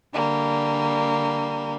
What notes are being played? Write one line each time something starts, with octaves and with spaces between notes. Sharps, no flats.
D3 G3 A#3